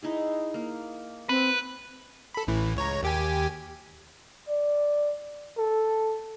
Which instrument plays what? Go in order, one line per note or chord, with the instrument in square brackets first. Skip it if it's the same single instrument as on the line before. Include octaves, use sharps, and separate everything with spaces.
[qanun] D#4 E4 G#4
A#3
[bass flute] C4 [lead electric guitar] B4
[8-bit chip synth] A4 B5
A1 A2 E3
C#2 C#5 A#5
D#2 G4 G#5
[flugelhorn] D5
A4